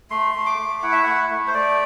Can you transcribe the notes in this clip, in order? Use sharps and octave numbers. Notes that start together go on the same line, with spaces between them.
A3 C6
A3
D6
A3
E4 F#5
E5
A3 F#5
A3
C5
A3 D5